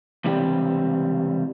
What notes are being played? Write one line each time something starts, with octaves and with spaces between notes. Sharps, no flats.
C#2 C3 E3 G3 C4 G5